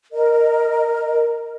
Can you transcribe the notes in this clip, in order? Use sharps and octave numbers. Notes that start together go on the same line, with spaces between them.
A#4 D#5